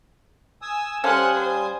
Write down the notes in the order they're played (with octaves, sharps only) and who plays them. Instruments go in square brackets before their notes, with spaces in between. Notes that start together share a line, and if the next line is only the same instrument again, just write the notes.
[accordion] G#5 D#6 E6
[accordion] G3 G#5 D#6 [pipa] C#4 A4 F5 [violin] C5 F#5
[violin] C5